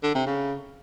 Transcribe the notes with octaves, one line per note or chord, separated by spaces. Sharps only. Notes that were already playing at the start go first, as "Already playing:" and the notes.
D3
C3
C#3